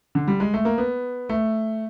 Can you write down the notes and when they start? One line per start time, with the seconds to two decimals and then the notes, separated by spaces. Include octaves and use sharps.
0.15 D3
0.28 G3
0.40 G#3
0.54 A3
0.65 A#3
0.78 B3
1.29 A3